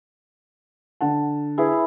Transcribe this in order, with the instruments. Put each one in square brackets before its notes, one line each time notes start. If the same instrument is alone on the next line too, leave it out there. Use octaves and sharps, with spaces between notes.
[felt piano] D3 F#5 A5
[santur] E4 G#4 B4